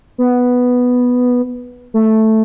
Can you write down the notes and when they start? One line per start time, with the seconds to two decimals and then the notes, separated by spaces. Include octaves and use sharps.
0.18 B3
1.94 A3